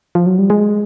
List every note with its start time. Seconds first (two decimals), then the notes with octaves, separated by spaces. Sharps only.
0.15 F3
0.26 F#3
0.39 G3
0.50 G#3